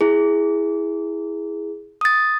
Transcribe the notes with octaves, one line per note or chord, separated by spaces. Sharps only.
E4 G#4
D#6 A6